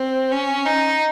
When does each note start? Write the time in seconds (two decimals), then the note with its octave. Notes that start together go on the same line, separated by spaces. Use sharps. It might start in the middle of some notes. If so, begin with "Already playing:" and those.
Already playing: C4
0.32 C#4
0.65 D#4